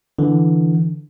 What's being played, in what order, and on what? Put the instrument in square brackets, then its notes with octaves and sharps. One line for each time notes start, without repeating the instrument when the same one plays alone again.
[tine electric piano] D3 E3